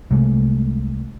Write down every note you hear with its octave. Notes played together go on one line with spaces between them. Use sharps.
C2 C3 G#3 A3